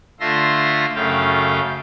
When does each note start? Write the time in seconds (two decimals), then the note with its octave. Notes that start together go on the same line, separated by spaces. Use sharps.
0.20 D3 A3 F4 E5 C6 A#6
0.95 F#2 C#3 A3 F5 G5